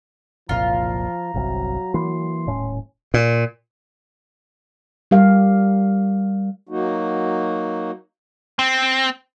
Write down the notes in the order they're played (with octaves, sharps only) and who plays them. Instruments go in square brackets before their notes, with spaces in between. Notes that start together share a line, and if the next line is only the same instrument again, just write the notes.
[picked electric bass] F#1 C2 A#2 [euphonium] F3 [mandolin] F4 [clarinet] A#5
[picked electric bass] G1 C2 C3 [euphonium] F#3
[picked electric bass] E3 A#3 [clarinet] C6
[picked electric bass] D#1 A2 C#4
[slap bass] A#2
[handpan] G3 G4 A#4 F5
[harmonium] F#3 A#3 D#4 F#4
[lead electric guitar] C4